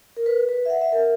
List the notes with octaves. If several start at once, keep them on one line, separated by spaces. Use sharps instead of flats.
A#4
B4
B4
E5
F#5
E5
A#4